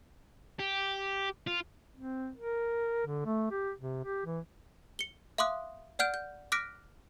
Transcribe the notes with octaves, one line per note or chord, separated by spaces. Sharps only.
G4
F4
C4
A#4
D3
A3
G4
C3
G4
E3
C#7 G7
E5 F5 C6 D6 D#6 F#6
D5 F#5 F6 G6 D7
G6
D6 F6 F#6 A#6 B6 D7